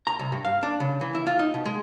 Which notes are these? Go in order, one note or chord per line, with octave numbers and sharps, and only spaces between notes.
A#5
C2
G2
F5
D4
C#3
E3
E4
F4
D#4
B2
G#3